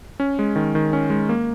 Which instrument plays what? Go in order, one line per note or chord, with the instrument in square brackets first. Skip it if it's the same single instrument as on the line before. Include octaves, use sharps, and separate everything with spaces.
[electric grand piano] C#4
G#3
D#3
D#3
C#4
G#3
A#3